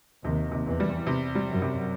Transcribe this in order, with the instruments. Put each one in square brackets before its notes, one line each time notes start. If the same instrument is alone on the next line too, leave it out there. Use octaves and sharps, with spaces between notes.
[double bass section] D#2 D#3 [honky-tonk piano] C3
[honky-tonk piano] C3
[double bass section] E2 E3
[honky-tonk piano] G3
C3
G3
[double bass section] F#2 F#3
[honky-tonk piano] C3